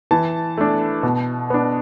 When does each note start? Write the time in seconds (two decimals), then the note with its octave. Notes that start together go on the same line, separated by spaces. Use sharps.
0.11 E3 A5
0.57 A3 D4
1.03 B2
1.50 B3 D4